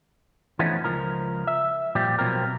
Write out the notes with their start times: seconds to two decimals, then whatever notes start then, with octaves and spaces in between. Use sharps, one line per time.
0.59 E3 F3 A3 B3 C#4 D#4
0.84 C#2 F3 A#4
1.47 E5
1.95 A#2 F3 G3 G4
2.19 B1 F2 B2 F3 C4 A#4